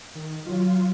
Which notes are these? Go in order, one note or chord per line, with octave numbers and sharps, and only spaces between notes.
D#3
F#3 F4